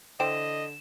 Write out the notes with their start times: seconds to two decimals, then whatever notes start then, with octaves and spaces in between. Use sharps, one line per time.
0.20 D3 E3 C5 D#5 G5 E7